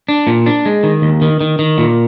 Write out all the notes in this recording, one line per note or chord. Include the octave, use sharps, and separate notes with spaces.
D4
A#2
D4
G#3
D#3
D#2
D#3
D#3
D#3
A#2